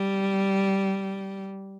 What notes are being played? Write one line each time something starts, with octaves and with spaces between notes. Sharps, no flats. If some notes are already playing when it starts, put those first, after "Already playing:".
Already playing: G3